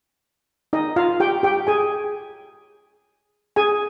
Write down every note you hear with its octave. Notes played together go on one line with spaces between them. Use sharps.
D#4 D#5
F4 F5
G4 G5
G4 G5
G#4 G#5
G#4 G#5